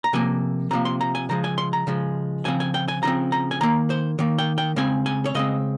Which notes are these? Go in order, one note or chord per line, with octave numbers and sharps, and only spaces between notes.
A#5
C3 F3 A#3 G#5
C3 F3 A#3 A#5
C6
A#5
G#5
C#3 F3 G#3 A#5
G#5
C6
A#5
C#3 F3 G#3
C#3 F3 C4 G#5
G#5
G5
G#5
C#3 F3 C4 A#5
A#5
G#5
D#3 A#3 A#5
C5
D#3 A#3
G5
G5
C#3 G#3 C4 G#5
G#5
C#5
C#3 G#3 C4 D#5